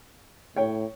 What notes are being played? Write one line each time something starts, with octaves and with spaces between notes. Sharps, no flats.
A2 C#5 G5